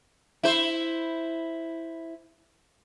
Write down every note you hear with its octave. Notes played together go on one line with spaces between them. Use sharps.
E4 C5